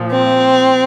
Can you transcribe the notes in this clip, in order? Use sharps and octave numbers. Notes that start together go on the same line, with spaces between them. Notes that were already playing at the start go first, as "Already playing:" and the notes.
Already playing: A#2 F3
C4